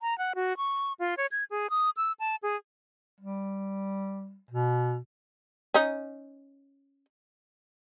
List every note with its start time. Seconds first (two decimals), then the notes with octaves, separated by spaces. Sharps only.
0.01 A#5
0.18 F#5
0.35 F#4
0.57 C#6
1.00 F4
1.17 C#5
1.32 G#6
1.51 G#4
1.70 D#6
1.97 E6
2.20 A5
2.43 G#4
3.21 G3
4.51 B2
5.74 C#4 D#4